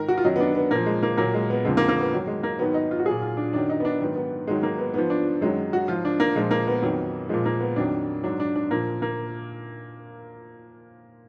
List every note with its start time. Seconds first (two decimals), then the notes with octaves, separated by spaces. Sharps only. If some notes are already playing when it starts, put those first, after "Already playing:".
Already playing: G#2 D#3 A#4
0.08 F#4
0.17 F4
0.24 F#2 D#3 F#3 D#4
0.36 B3
0.40 D4
0.55 B3
0.71 A#2 F3 A#3
0.86 G#3
1.03 A#3
1.17 A#2 F#3 A#3
1.34 G#3
1.50 B3
1.65 F2 D3 F3 G#3
1.77 A#3
1.89 A#3
2.00 B3
2.12 G#2 D#3 F#3
2.27 G#3
2.43 A#3
2.59 G#2 D#3 F#3 B3
2.74 D#4
2.91 F4
2.99 F#4
3.06 F#3 G#4
3.11 A#2
3.22 F4
3.37 D4
3.53 F#2 D#3 F#3 D4
3.70 D#4
3.80 B3
3.85 D4
4.01 G#2 D#3 F#3 B3
4.16 B3
4.47 G#2 D#3 F#3 G#3
4.63 A#3
4.78 B3
4.94 G#2 F3 B3
5.10 D4
5.41 F#2 D#3 F#3 G#3
5.73 F#4
5.88 G#2 F3 F4
6.05 D4
6.20 A#3
6.36 A#2 F3 G#3
6.51 A#3
6.67 B3
6.82 F2 D#3 F#3
7.29 A#2 F3 G#3
7.45 A#3
7.61 B3
7.76 F2 D#3 F#3 D4
8.23 G#2 F#3 D4
8.40 D4
8.56 D4
8.71 A#2 F3 A#3
9.02 A#3